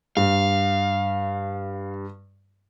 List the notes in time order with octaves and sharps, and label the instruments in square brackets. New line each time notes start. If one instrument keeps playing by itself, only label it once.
[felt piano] G2 [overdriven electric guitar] F5